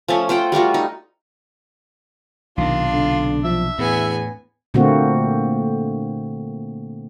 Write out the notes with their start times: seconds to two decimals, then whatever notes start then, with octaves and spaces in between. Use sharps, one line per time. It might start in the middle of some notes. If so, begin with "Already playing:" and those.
0.08 F3 A3 C#4
0.29 F4 C5 F#5 G5
0.52 G3 A3 F4 F#4
0.74 D#4
2.58 B1 C3 D#3 D4 F4
2.93 D3
3.44 F3 E5
3.79 E2 A2 B3 G#5
4.74 A#2 D3 A3 A#3 C4 F#4